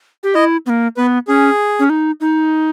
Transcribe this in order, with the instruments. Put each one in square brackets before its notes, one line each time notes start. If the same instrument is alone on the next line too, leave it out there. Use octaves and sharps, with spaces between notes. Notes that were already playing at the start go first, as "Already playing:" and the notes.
[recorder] G4
[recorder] E4 [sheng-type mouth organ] D#5
[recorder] B3
A#3
[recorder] B3 [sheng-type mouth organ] B4
[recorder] C#4 [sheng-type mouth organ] G#4
[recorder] C#4
D#4
D#4